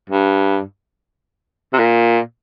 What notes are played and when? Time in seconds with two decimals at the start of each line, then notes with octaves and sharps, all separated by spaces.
0.09 G2
1.73 C3
1.78 A#2